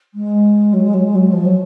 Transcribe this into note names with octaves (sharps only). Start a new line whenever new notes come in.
G#3
F#3
G#3
F#3
G#3
F#3
F3
F#3